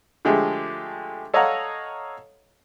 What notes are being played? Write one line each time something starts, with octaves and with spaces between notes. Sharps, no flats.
D3 F3 G#3 A3 G4
A4 C#5 D#5 F5 F#5 A#5